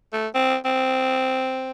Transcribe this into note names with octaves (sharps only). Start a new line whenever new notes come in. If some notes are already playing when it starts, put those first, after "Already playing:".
A3
C4
C4